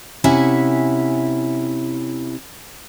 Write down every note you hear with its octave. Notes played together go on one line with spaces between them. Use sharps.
C3 C#4 E4 E5 F#5 G#5